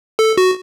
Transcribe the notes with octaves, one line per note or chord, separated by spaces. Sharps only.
A4
F#4